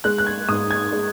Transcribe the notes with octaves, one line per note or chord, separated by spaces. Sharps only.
G#3 F#6
F#6
G#6
G#2 D#6
G#6
G#3